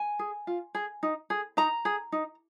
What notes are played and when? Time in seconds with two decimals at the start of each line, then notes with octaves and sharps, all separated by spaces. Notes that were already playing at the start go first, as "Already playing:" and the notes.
Already playing: G#5
0.19 G#4
0.47 F4
0.75 G#4
1.03 D#4
1.30 G#4
1.57 D#4 A#5
1.85 G#4
2.12 D#4